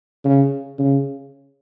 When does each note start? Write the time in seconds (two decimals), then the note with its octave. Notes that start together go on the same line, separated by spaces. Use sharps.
0.24 C#3
0.79 C#3